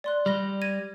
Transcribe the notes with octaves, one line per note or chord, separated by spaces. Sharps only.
D5 C6 F#6
G3 B5 A#6 G7
G#6 A#6 D#7